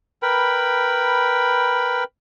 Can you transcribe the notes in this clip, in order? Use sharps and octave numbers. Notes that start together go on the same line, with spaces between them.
A#4 B4 G5 B5